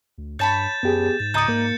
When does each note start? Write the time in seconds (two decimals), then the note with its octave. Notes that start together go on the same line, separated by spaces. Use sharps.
0.18 D2
0.39 G2 C#5 A5 B5 G6 A6 E7
0.83 F#2 B3 G4 G#4
1.20 G#2 A6
1.34 C#2 D#4 D5 A#5 D#6 G6 A6 C#7
1.48 G#2 A#3 A#4